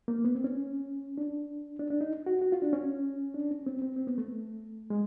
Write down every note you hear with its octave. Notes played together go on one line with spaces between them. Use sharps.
A#3
B3
C4
C#4
D4
D4
D4
D#4
F#4
F#4
F4
D4
C#4
D4
C#4
C4
C4
C4
B3
A3
G#3